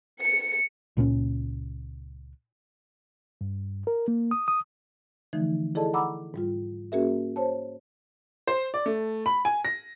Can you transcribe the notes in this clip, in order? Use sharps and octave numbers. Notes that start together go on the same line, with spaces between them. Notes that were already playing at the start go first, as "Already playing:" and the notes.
C#7
C#2 A#2 G3 C#4
G2
A#4
A#3
D#6
D#6
D3 E3 F3 A3 D#4
E4 G#4 A4 D5 D#5 A5
F#5 A#5 B5 D6 E6
G#2 G3 F4
A#3 C#4 F#4 G#4 A#4 E5
C5 C#5 A5
C5
D5
A3
B5
G#5
A#6